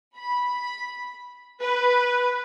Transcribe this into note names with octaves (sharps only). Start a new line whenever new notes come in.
B5
B4